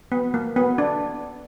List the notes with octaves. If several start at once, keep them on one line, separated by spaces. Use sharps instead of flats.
B3
A#3
B3
D4